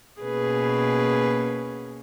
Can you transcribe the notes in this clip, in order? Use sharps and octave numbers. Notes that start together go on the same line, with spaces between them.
B2 A#3 C#4 G#4 B4